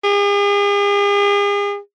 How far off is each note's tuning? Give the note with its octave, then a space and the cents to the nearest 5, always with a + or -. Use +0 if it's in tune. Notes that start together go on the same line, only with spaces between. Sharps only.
G#4 -45